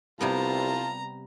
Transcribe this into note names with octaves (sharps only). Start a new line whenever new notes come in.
C2 C3 G3 B3 F4 A5 A#5